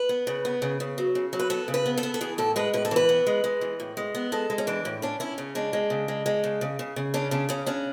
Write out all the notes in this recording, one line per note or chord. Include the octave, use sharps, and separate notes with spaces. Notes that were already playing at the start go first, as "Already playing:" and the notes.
Already playing: B4
B3
C#3
B3
C#3
C#3
F#3
C#3
F#3
B4
B3 A4
C#3
B4
B3
A4
B3
A4
E3 G#4
A2 A4
G#3 B4
A2 B4
A4
E3 B4
B3
G#3
G#3
E3
A2
G#3
B3
G#3 A4
G#3
C#4
E3 D4
A2
C#4 D4
C#4 E4
C#3
G#3 D4
G#3
C#3
G#3
G#3
C#3
C#3
C#3
C#3
C#4 D4
C#3 D4
C#3 C#4
C#4 D4